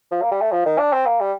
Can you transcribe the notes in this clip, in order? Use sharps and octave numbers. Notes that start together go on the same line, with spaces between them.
F3
A#3
G3
A3
F3
D#3
D4
C4
A#3
G3